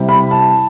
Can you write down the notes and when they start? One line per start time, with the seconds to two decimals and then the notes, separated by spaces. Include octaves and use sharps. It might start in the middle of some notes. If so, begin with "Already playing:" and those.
Already playing: C3 G3 C4 E4
0.09 B5
0.31 A5